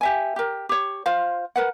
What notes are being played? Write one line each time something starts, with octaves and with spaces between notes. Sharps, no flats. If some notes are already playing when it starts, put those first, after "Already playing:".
G4 E5 G#5
G4 A#4
G4 C#5
F4 C5 F5
A#4 B4 F#5